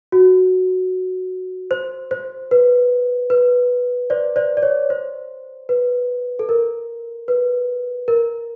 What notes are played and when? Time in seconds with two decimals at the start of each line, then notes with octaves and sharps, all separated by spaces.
0.12 F#4
1.71 C5
2.11 C5
2.51 B4
3.30 B4
4.10 C5 D5
4.36 C5 D5
4.57 D5
4.63 C#5
4.90 C5
5.69 B4
6.39 A4
6.49 A#4
7.28 B4
8.08 A#4